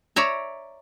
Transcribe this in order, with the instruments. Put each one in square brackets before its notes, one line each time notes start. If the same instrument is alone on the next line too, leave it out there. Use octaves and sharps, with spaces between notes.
[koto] C#5 D5 E5 A#5